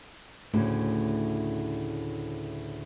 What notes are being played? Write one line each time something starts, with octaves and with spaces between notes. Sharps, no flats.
D2 A2 C#3